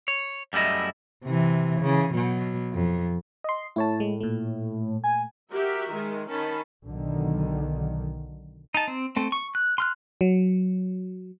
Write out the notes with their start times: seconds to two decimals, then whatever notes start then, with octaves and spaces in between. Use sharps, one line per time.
0.08 C#5
0.53 F#2 G3 A3 E4 D#5
1.24 C3 E3
1.81 C#3 E3
2.14 B2 F#3
2.73 F2
3.44 D#5 C6
3.76 A2 E4 C#5 A5
4.00 G#3
4.20 A#2 A3
5.04 G#5
5.54 F#4 G4 A#4 E5
5.94 D#3 G#3
6.30 D#3 C#4 A5 B5
6.85 B1 D3 D#3
8.75 D#4 A5
8.88 C4
9.16 A3 C4
9.32 C#6
9.55 F#6
9.78 C6 F6 F#6
10.21 F#3